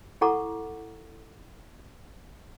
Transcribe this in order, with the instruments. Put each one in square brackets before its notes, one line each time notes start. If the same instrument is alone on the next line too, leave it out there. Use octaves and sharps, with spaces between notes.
[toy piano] E4 A4 F#5 A#5 C#6 D6